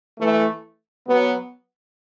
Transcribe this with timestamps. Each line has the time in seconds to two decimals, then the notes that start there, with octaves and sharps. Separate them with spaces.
0.19 E3 A3
1.08 F#3 B3